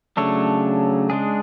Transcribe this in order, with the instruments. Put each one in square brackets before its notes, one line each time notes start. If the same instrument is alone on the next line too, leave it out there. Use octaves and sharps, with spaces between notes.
[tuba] C#3 [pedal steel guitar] F#3 A3 D4 A4 C#5
[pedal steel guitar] G#3 D4 G#4